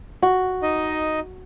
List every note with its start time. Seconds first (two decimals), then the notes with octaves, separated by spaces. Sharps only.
0.22 F#4
0.62 D#4 D#5